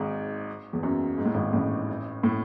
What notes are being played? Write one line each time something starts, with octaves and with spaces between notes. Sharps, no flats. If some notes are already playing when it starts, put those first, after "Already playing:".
Already playing: G#1 G#2
E2
F#2
G#2
A2
G#1 G#2
A1 A2
A2